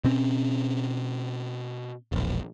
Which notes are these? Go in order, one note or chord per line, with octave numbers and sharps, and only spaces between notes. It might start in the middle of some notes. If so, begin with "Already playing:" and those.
B2 C4 C#4
E1 A#1